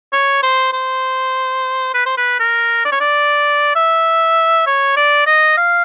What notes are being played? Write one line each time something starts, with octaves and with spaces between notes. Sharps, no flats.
C#5
C5
C5
B4
C5
B4
A#4
D5
C#5
D5
E5
C#5
D5
D#5
F5